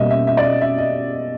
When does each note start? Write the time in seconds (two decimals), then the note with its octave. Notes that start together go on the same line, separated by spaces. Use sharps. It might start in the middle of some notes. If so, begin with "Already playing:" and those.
Already playing: B2 G3 A#3 C#4 D#5 E5
0.11 E5
0.27 E5
0.37 D5
0.44 D#5
0.61 E5
0.78 D#5